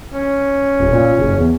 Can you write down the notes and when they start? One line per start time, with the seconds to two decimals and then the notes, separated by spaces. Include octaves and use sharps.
0.13 C#4
0.80 D#1
0.92 A#2
1.18 F#1
1.37 E2